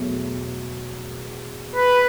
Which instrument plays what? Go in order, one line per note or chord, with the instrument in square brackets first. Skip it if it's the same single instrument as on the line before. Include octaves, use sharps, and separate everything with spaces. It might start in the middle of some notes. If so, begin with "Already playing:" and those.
Already playing: [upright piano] E2 B2 F#3 A3
[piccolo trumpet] B4